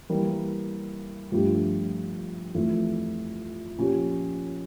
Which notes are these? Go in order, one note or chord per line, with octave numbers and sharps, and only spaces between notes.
E3 G3 A#3
G2 F3 A3 D4 G4
F2 E3 A3
A#2 F3 C#4 G4